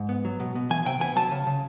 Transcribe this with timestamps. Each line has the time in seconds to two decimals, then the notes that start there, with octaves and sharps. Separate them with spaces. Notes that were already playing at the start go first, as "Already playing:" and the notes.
Already playing: G#2
0.09 B3
0.25 F#3
0.40 B2
0.55 B2
0.70 E3 G#5
0.86 C3 G5
1.00 B3 G#5
1.16 F#3 A5
1.31 C#3
1.47 C#3